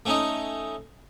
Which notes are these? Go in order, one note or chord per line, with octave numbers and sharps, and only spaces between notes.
A3 C#4 D#4